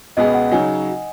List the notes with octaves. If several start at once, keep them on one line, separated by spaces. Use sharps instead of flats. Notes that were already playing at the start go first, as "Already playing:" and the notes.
C#2 B2 B3 G#4 D#5
F#5
C#3 F#3 D#4 G#5